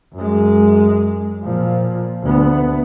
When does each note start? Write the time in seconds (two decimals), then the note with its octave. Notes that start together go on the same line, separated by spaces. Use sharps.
0.14 F#2 G#3
1.44 A#2 F3
2.23 D2 B3